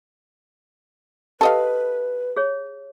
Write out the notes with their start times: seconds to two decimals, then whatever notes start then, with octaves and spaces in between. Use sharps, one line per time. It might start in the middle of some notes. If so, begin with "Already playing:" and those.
1.41 G4 A4 B4 D#5 F5
2.36 G#4 C#5